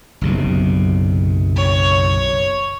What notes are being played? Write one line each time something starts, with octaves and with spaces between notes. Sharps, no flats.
F#1 B1 C3
C#5